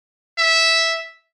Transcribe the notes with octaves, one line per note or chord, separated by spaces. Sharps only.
E5